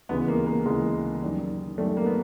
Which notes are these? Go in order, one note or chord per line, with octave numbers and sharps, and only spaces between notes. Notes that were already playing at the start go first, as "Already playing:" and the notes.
D2 C#3 E3 G#3 B3
A#3
A#3
D2 C#3 E3 G#3
F#2 D#3 G3
F#2 D#3 G3 A3
A#3
B3